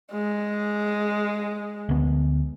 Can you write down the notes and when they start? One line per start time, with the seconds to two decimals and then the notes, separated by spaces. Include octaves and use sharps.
0.12 G#3
1.89 D2 B3